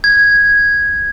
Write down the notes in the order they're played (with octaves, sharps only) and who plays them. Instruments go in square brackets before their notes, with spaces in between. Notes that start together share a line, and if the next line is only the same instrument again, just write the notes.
[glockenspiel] G#6